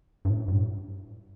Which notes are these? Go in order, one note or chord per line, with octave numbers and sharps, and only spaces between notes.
G2
A2
G2